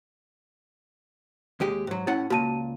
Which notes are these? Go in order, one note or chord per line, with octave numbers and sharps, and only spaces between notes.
D#2 G#3 G4
G#2 F#3
A2 C#4 E4 F#5
C#2 A#2 F#4 A5 D#7